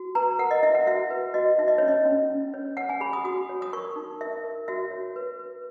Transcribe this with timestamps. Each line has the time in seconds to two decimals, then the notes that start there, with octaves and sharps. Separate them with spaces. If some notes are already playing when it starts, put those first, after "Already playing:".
Already playing: F#4
0.15 B4 A#5
0.39 A#4 F#5
0.51 D#5
0.63 E4 E5
0.75 F#5
0.87 F#4 E5
1.10 B4
1.34 F#4 D#5
1.58 D#4 E5
1.68 D#5
1.78 C#4 C#5
1.88 D#5
2.05 C#4
2.30 C#4
2.54 C#5
2.77 C#5 F#5
2.89 G#5
3.01 G#4 B5
3.13 D#6
3.24 F#4 D#6
3.49 C#5
3.62 D#6
3.73 A#4 C#6
3.96 D#4
4.20 A#4 E5
4.44 A#4
4.68 F#4 E5
4.91 C#5
5.16 B4
5.40 B4